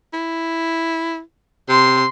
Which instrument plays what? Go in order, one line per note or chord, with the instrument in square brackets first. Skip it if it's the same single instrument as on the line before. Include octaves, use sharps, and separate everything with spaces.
[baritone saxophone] E4
[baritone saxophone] C3 [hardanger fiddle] C6